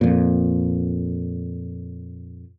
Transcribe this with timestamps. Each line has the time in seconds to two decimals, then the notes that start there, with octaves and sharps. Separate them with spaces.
0.01 F2 A#2